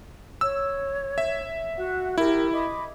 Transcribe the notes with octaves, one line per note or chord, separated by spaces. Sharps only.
C#5 E6
E5
F#4 F#5
E4 G4 A#4
D#5 B5 D6